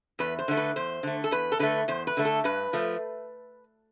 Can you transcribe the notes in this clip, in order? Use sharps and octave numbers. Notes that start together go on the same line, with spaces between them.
E2 B4
C5
D3 A3
B4
E2 C5
D3 A3
A4
E2 B4
A4
D3 A3 B4
E2 C5
B4
D3 A3
A4
G2 B4
F3 A3